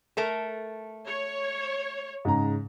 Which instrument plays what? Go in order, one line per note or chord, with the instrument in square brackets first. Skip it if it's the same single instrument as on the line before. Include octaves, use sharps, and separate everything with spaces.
[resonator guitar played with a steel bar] A3 A#4 A5
[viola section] C#5
[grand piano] G#2 C#3 A#5